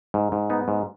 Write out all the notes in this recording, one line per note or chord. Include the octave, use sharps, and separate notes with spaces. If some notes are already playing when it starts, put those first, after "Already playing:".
G#2
G#2
B3 D#4
G#2